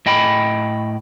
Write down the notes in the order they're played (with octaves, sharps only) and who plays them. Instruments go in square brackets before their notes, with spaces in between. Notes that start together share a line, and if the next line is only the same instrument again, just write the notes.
[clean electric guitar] A2 D#5 G5 B5